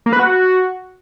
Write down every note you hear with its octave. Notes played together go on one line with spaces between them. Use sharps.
A#3
B4
F#4